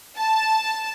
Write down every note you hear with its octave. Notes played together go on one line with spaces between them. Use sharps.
A5